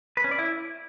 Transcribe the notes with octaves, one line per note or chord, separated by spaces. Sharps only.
B4
C#4
D5
E4